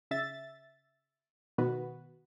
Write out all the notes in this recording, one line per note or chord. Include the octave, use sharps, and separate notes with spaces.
C#3 E5 A6
B2 D#3 B3 F#4 B4